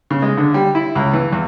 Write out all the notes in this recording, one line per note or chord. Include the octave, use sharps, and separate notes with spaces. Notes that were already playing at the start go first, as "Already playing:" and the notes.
C#3
G#3
D3
G3
E4
C#2
E3
E2